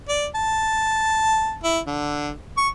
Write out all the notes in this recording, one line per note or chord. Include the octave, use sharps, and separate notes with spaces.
D5
A5
E4
D3
C#6